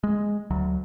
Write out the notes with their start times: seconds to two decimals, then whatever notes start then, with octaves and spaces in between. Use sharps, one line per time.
0.04 G#3
0.51 D2 F#3